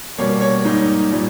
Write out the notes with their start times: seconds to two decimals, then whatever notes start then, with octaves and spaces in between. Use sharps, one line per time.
0.18 B2 G3 A#3 C#4 C#5
0.41 C#5
0.65 G#2 G3 A#3 D#4
1.12 A#2 G3